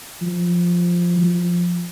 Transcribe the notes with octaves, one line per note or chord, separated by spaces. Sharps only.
F3
F3